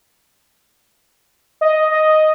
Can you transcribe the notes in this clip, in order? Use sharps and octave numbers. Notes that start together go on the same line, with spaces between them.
D#5
D#5